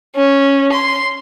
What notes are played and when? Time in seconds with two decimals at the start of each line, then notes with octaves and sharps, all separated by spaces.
0.16 C#4
0.72 C6